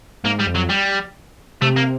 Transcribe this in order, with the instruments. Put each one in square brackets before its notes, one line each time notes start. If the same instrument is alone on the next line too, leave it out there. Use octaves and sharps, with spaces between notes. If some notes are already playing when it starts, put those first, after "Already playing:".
[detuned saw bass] G#2 [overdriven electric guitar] A#3
[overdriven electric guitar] G3
[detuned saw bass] F2
[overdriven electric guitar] F#3
G3
[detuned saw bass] C3 [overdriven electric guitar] A3
[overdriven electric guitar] A#3